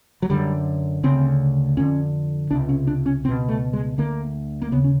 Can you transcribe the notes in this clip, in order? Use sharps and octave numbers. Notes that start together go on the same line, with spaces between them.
F#3
F#2 D3 G3
D2 C#3 C4
F2 D3 C#4
C#2 C3 D4
C#4
D4
C#4
C#2 B2 C4
A3
G#3
D2 D3 A#3
A#3
D#2 C#3 B3
C#4